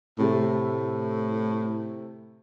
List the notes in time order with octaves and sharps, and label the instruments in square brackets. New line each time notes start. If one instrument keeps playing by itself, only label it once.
[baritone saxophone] A2 [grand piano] C3 A3